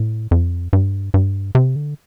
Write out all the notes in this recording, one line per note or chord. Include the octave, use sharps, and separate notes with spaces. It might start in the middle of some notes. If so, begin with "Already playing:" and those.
Already playing: A2
F2
G2
G2
C3
D3